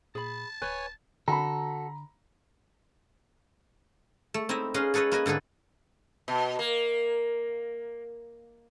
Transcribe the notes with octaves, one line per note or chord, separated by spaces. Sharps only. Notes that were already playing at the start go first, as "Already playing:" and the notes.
A#2 G#4 A5 B5
D1 B4 C#5 G#5
D3 F#4 A4 A#5 B5
A3
C4 D#4 E4 D#5 E5
C#4 G#4 B4 F5 A#5 C6
G#4 A4 B4 C#5 D#5
A#3 B4 D#5 G#5
G#2 D3 G#4 A4 B4
B2
A#3